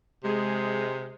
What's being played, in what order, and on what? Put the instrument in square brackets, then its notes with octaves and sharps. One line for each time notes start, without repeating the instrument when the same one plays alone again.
[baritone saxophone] C3 [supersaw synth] G#3 G#4